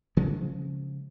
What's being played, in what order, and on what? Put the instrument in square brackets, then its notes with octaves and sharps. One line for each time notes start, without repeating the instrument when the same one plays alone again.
[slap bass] C#3 F3 G#3 C#4